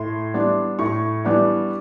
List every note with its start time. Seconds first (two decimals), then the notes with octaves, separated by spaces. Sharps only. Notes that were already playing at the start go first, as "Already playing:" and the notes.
Already playing: A2 C6
0.34 E3 G3 B3 D4
0.79 A2 C#6
1.25 E3 G3 B3 D4